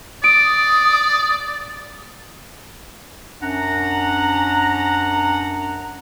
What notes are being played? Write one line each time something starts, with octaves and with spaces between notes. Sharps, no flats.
D5 D#6 D7
F#2 C#4 D4 F#5 A#5